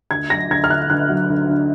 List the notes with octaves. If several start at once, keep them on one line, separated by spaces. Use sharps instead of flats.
D2 G#6
F#3 A#6
D2 G#6
F6
D3 F#6
D2 F#6
F#3
D2
D3